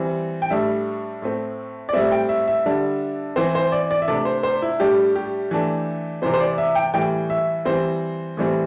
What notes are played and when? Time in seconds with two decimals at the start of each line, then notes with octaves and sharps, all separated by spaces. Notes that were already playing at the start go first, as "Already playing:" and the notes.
Already playing: E3 G3 C4
0.42 G5
0.50 A2 G3 D4 E5
1.22 A2 A3 C4
1.89 D5
1.93 A2 G3 C4 E5
2.12 G5
2.29 E5
2.48 E5
2.66 D3 G3 D4
3.36 E3 C4 C5
3.55 C5
3.72 D5
3.91 D5
4.02 E5
4.08 C3 A3 D4 D5
4.25 C5
4.43 C5
4.62 E4
4.80 A2 G3 D4 G4
5.15 G4
5.51 E3 A3 D4
6.22 C3 E3 C4 C5
6.34 C5
6.41 D5
6.58 E5
6.75 G5
6.94 A2 E3 G3 G5
7.30 E5
7.65 E3 G3 C4 C5
8.37 A2 E3 G3 C4